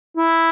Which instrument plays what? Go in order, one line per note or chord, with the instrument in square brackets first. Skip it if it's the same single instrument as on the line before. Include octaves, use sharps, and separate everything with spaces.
[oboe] E4